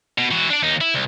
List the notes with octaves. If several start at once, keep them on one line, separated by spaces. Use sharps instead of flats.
B2
E3 F#4
D4 D5
D#2 D#4
E4
C2